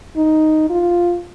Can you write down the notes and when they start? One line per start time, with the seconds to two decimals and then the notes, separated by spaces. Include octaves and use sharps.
0.16 D#4
0.70 F4